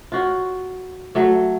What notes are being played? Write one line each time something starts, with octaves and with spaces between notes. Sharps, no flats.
F4 F#4 C#5
F#3 A3